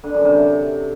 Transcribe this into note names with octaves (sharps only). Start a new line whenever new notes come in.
D3
F#2
C3